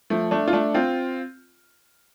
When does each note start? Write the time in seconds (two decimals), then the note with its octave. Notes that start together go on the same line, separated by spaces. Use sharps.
0.10 F3 A3
0.31 A3 D4
0.48 F4
0.53 A3 D4
0.74 C4 F4